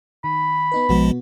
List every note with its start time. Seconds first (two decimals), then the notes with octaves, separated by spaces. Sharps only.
0.24 D#3 B5
0.72 B3 D#4 B4
0.89 A#1 B2 F3 G#3 B3 F#4